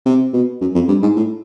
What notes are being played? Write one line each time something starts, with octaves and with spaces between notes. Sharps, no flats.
C3
B2
F#2
F2
G2
G#2
A2